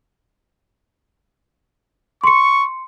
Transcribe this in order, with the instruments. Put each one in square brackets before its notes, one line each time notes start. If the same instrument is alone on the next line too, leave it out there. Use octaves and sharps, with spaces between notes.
[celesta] C6 C#7 [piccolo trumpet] C#6